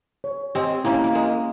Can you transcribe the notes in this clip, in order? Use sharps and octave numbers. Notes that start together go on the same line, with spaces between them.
C#5
G#3 C4 G4
A#3 C#4 E4
A#3
G#3 A#4